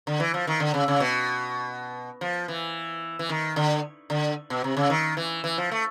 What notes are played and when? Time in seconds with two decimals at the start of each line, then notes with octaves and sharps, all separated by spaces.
0.07 D3
0.20 E3
0.34 F3
0.47 D#3
0.60 D3
0.74 C#3
0.88 C#3
1.00 B2
2.21 F3
2.48 E3
3.19 E3
3.29 D#3
3.56 D3
4.10 D3
4.50 B2
4.64 C3
4.77 C#3
4.90 D#3
5.17 E3
5.44 E3
5.58 F3
5.72 A3